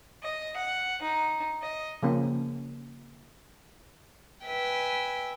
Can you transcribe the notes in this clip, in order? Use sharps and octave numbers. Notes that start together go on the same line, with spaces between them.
D#5
F#5
D#4
D#5
C#3 F3 A#3 C#4
B4 E5 G5 G#5